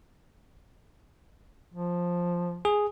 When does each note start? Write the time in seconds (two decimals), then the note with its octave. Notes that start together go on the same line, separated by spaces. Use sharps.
1.74 F3
2.65 G#4